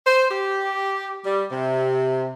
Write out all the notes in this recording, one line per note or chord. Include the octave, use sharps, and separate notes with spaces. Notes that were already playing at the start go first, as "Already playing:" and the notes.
C5
G4
G3
C3